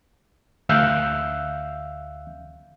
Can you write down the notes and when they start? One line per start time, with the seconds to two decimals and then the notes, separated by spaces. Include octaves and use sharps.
0.69 D2 E5 F5 E6 F#6 G6